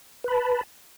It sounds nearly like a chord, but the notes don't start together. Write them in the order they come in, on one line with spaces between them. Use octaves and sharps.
B4 B5 A5